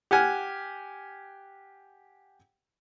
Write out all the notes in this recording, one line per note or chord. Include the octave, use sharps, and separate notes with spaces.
G4 F#5 G#5 F6